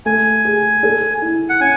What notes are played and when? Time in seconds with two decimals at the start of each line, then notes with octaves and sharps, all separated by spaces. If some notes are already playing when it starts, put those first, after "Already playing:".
0.06 A3 G#5
0.45 G#4
0.83 A4
1.22 E4
1.49 F#5
1.60 C#4 G#5